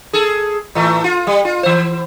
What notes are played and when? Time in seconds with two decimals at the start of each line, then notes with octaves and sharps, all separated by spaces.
0.13 G#4 A4
0.75 A2 E3 A3
1.04 F4
1.27 G3
1.45 F4
1.63 E3 C5